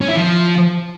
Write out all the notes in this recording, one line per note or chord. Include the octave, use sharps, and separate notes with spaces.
C#4
E4
F3